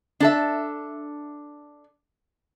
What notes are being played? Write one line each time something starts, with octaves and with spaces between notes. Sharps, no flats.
D4 A4 E5